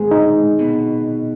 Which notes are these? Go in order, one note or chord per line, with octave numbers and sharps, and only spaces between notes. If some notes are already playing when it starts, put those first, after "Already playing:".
Already playing: G#2 D#3 G#3 G#4
D#4
B2